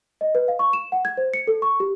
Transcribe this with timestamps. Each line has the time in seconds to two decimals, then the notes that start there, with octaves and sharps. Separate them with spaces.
0.21 D#5
0.35 B4
0.48 F5
0.59 C#6
0.73 E7
0.92 F#5
1.05 G#6
1.17 C5
1.34 C#7
1.47 A4
1.62 C#6
1.80 G4